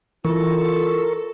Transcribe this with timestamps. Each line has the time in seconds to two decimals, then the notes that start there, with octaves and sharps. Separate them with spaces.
0.25 E3 F4 A4 A#4 C#6